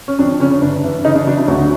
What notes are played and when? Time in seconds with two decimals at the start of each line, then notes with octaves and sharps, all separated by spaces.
0.08 C#4
0.19 F2 D4
0.40 C#3 C#4
0.62 G1 D4
0.84 E3
1.05 C#3 D#4
1.15 D4
1.27 F#3 D4
1.38 E4
1.48 D2 F#4